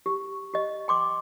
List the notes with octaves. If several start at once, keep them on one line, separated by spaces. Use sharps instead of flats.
G4
G4 D#5
G5 C6 D6